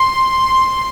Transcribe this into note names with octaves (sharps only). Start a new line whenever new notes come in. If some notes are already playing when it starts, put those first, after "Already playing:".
Already playing: C6